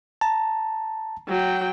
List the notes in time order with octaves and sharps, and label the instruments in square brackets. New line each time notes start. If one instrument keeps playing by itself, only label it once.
[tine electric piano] A5 A#5
[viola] F#3 G5